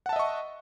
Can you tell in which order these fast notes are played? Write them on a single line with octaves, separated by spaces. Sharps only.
F#5 A5 E5 D#5 C#6